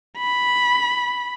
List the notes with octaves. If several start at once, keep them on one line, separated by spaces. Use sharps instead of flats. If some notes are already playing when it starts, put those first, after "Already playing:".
B5